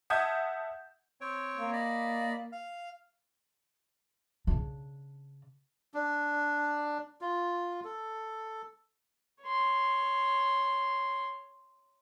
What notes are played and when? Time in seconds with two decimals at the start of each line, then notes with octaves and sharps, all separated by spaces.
0.10 E5 F#5 A5 D#6 G6 G#6
1.21 C4 C#5 G5
1.58 A#3
1.73 D5 D#5 B5
2.52 F5
4.47 C#3 D4
5.94 D4
7.21 F4
7.84 A4
9.43 C#5 C6